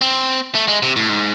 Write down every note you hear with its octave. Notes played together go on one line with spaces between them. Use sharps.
C4
A3
G#3
C3
A2
G#2